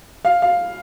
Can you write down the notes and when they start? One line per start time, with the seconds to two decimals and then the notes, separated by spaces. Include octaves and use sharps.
0.25 F5
0.42 F5